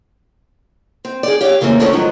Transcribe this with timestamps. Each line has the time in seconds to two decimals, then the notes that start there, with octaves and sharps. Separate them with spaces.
1.05 C4
1.23 G#4 D5
1.41 G4 C#5 F5
1.61 C#3 E3 A3 A#3 C4
1.80 D3 D#3 F3 A3 B3 C#4
1.93 G#2 D#3 F3 F#3